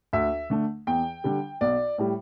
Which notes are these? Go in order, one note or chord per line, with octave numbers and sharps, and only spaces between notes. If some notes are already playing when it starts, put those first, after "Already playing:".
D2 E5
D3 A3
E2 G5
D3 G3
B1 D5
A2 G3